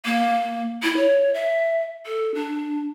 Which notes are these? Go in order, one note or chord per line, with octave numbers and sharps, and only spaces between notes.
A#3
E4
C#5
E5
A4
D4